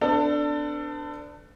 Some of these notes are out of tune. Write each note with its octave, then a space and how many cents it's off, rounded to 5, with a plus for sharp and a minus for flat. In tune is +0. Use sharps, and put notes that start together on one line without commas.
B3 +45 D4 +0 A4 +25